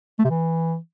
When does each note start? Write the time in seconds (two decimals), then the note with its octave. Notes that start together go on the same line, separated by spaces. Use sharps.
0.19 A3
0.25 C3
0.30 E3